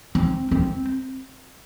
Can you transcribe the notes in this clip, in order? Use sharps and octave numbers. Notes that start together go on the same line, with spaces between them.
C4
C4